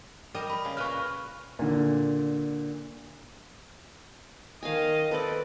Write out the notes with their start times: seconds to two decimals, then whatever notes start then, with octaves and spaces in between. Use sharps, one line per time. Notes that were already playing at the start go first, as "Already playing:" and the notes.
0.35 G3 A#4 D#5
0.50 B5
0.65 C#3
0.77 A#2 A#4 B4 C#6 F6
1.59 A#2 D3
4.63 D#3 D#5 F5 G#5
5.11 C4 A4 B4 D5